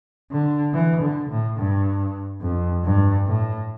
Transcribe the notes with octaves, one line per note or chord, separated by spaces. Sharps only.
D3
E3
D3
A2
G2
F2
G2
A2